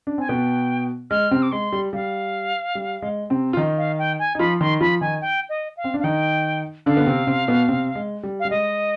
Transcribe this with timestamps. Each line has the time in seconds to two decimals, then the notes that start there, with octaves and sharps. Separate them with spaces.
0.07 D4
0.18 C4 G#5
0.29 B2 B3 G5
1.11 G#3 F6
1.31 C3 C4
1.42 D6
1.52 G#3 C6
1.73 G3
1.93 G3 F5
2.75 G3
3.02 G#3
3.30 C3 C4
3.53 F4
3.57 D#3 D#4
3.78 F5
3.99 G5
4.19 G#5
4.35 D#4
4.39 F3 F4 B5
4.60 D#3 D#4 C6
4.80 F3 F4 B5
5.01 D#3 D#4 G#5
5.21 G5
5.49 D#5
5.77 F5
5.84 C4
5.94 D4
6.00 F5
6.04 D#3 D#4 G5
6.86 D3 D4 F5
6.97 B3
7.06 C3 C4
7.27 C3 C4
7.48 B2 B3
7.68 C3 C4
7.95 G#3
8.23 G3
8.40 F5
8.45 G3
8.50 G#3 D#5